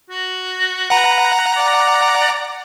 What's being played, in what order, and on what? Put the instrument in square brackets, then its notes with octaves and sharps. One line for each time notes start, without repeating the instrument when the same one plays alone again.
[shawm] F#4
[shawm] B4 [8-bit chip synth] F#5 A#5
[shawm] D5